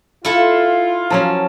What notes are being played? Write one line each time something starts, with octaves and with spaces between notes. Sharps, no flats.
E4 F4 A4
F3 F#3 C#4 A#4 A5